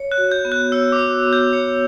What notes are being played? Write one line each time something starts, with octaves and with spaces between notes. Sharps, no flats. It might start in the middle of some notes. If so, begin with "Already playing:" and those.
Already playing: C#5
F#6
F#4
G6
B3
F#6
C#5 E6
D6
F#4
B3
G6
C#5